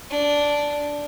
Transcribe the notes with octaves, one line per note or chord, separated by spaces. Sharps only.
D4